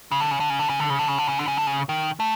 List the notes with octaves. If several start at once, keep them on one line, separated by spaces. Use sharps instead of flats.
C#3
D3
C#3
D3
C#3
D3
C#3
D3
C#3
D3
C#3
D3
C#3
D3
C#3
D3
C#3
D#3
A3